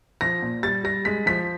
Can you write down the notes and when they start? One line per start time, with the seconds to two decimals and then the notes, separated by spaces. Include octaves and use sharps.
0.21 F3 A#6
0.42 A#2
0.63 G3 A6
0.84 G3 A#6
1.05 G#3 B6
1.26 F3 B6